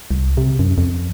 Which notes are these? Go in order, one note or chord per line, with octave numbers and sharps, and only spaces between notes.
C2
C3
F#2
F2